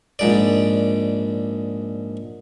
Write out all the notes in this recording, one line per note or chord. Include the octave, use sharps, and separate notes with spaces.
A#1 G#2 D5